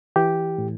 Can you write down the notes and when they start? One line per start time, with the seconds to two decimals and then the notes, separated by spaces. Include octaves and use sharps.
0.16 E3 G4
0.58 A2